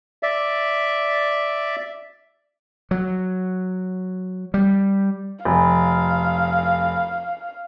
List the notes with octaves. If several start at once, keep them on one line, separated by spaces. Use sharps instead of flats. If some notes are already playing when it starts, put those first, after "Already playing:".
D5 E5
F#3
G3
F1 F5